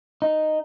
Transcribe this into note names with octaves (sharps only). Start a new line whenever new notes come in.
D#4